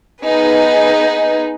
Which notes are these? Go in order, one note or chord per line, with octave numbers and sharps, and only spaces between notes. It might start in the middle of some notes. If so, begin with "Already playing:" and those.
B3 D#4 G#4 B4